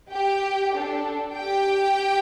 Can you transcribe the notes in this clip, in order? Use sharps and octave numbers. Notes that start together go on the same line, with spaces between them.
G4 G5
D4 A4
G4 G5